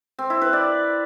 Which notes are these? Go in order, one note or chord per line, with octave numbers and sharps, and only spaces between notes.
C4
E4
B4
D5